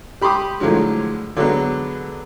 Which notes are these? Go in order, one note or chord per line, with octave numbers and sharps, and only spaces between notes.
G4 B5 C6 D6 D#6
A2 D3 F3 F#3 G#3
D3 F#3 G#3 B3